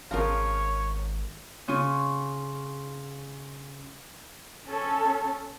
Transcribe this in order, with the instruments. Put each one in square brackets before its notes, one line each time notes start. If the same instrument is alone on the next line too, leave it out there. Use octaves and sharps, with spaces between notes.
[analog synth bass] G#1 [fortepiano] C#3 F3 F4 [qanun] A#4 A#5 [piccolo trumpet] C#5
[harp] C#3 C#4 F4
[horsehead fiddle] C#4 A4